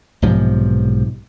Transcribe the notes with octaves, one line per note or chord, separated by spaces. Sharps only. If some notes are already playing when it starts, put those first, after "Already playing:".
B1 G#2 C3 F3